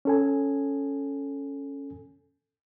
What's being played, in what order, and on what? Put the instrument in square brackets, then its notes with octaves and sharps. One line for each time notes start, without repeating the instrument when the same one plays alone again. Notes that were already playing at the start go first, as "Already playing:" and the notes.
[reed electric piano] C#4 A4 G#5